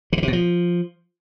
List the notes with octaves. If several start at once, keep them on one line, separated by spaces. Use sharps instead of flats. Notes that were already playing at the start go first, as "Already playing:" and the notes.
D3
D#3
C3
B2
F3